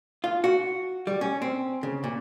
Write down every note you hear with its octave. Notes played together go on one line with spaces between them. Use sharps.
F4
F#4
G3
C#4
C4
C#3
A#2